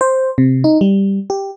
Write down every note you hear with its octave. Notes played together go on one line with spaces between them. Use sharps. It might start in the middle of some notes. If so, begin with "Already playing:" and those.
C5
C3
D#4
G3
G4